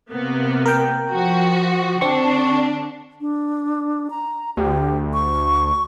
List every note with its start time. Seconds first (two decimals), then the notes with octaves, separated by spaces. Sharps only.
0.11 C3 A#3 B3
0.66 A#4 G5
1.11 F3 F#4
2.01 D3 C4 D4 C#6
3.21 D4
4.10 A#5
4.57 D2 G4
5.14 C#6